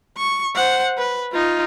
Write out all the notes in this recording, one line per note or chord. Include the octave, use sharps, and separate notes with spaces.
C#6
C5 F#5
B4
D#4 F4